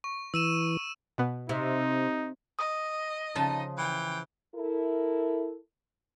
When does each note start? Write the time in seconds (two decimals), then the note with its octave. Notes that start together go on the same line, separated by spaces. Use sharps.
0.04 C#6
0.34 E3 E6 D#7 E7
1.18 B2 B3
1.49 C3 D#4
2.59 D#5 D#6
3.35 C#3 F3 D#4 A5
3.78 E3 G5
4.55 E4 A4 A#4